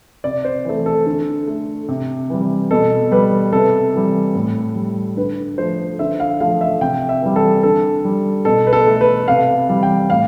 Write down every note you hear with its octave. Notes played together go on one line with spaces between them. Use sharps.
C3 D5
C5
E3 A3
A4
D3
A3
C3
E3 G3
B2 A4
G3 B4
C3 A4
E3 G3
A2
G3
D3 B4
F3 A3 C5
D3 E5
F5
F3 A3 F5
E5
C3 G5
E5
E3 G3
A4
D3 A4
G3
B2 A4
B4
A4
A3
B4
C3 F5
E3 G3
G5
A2 F5